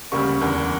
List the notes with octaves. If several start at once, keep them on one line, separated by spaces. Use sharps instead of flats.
D2 C#3 G3 A#3 C#6
E2 D3 A#3